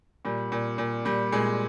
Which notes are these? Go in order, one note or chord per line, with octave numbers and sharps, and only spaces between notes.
A#2 G3
A#2
A#2
A#2 G3
A#2 G#3